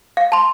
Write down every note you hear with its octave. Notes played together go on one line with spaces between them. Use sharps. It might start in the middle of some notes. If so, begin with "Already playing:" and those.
F5
A5 C6